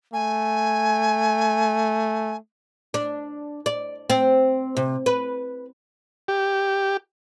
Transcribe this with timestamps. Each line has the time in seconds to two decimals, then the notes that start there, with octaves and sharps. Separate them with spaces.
0.13 A3 G#5
2.94 D4
3.66 D5
4.10 C4
4.77 C3
5.06 B4
6.28 G4